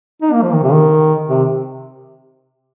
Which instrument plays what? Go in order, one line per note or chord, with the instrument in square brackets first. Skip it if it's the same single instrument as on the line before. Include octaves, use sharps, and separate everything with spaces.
[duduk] D#4
A#3
F3
D#3
C3
D#3
C3